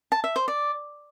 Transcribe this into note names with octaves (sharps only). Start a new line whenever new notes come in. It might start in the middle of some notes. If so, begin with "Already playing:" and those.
A5
E5
C5
D5